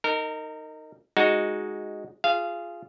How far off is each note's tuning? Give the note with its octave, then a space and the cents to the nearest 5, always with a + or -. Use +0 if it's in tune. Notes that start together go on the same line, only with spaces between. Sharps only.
D#4 +0 A#4 -25
G#3 +0 D#4 +0 F#4 +0
F4 +0 G#4 +0 F5 -20